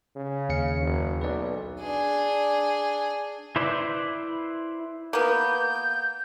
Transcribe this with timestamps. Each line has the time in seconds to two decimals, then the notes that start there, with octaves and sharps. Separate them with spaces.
0.16 C#3
0.49 D#2 F5 C#7
0.83 F#1
1.21 B1 B4 D5
1.81 D4 G#4
3.56 E4 B4 C5 D5
5.13 A#3 B3 G6